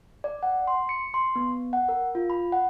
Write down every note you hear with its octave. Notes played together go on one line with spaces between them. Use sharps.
D5
F#5
C6
C#7
C6
B3
F#5
A#4
F4
B5
F#5